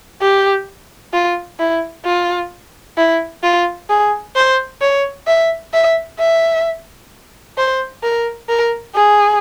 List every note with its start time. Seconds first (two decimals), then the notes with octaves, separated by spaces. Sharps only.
0.21 G4
1.13 F4
1.59 E4
2.05 F4
2.97 E4
3.43 F4
3.90 G#4
4.35 C5
4.81 C#5
5.27 E5
5.73 E5
6.19 E5
7.58 C5
8.03 A#4
8.49 A#4
8.95 G#4